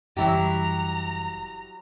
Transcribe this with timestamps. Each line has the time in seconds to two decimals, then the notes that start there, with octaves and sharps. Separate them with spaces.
0.17 F#1 E3 F#3 G3 E4 G4 A#5